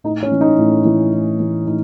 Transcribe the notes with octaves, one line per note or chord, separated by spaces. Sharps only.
A2 D#4
C#4
E3
D#4
A2
E3
A2
E3
A2 D#4